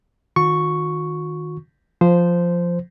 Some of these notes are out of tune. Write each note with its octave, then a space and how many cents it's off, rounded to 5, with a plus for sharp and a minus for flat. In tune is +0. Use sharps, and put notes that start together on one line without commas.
D#3 +0 F#4 -45 C#6 +0
F3 +0 C5 -10